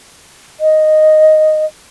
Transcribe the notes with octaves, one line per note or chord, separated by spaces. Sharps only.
D#5